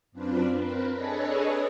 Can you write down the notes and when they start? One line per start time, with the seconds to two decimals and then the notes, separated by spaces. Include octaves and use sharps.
0.12 F#2 C4 D4 F4 B4
0.58 C4 A#4 B4
0.92 D4 G#4 A4 B4 C#5 D#5